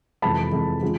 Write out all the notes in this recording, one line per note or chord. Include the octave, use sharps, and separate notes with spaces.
F2 C3 E3 G#3 A5 B5
F2 C3 E3 G#3
C#3 F3 G#3